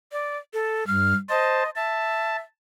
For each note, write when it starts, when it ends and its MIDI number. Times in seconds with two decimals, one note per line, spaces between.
0.12 0.38 74
0.54 0.87 69
0.87 1.13 43
0.87 1.15 89
1.29 1.63 72
1.29 1.70 75
1.29 1.63 81
1.76 2.39 76
1.76 2.37 81